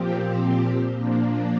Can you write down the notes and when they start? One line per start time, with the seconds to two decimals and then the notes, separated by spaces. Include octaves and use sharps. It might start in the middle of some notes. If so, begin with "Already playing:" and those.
Already playing: A#2 F3 C4 G4
0.93 A#2 F3 A#3 D4